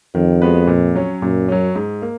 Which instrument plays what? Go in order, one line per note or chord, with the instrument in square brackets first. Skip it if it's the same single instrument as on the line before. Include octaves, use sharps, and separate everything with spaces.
[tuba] F2 [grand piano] D#3
[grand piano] G#3 B3 F#4 B4
A#2
F#3 C#4
[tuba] F#2 [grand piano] A#2
[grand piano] F#3 C#4
G#2
A#3